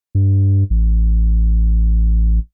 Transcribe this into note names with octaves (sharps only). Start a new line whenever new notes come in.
G2
A1